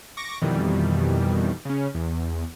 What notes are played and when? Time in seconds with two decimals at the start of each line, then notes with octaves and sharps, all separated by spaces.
0.17 C#6 D6 A#6
0.42 F2 B2 D#3 E3 G3
1.65 C#3 C#4
1.95 E2